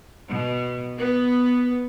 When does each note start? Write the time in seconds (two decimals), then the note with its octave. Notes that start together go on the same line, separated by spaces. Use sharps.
0.28 B2
0.98 B3